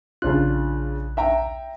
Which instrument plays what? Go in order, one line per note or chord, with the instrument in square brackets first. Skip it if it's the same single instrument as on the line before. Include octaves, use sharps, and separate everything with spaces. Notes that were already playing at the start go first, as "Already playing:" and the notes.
[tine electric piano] A#1 F#6 [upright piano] C#3 D4 F4
[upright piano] E5 G5 A#5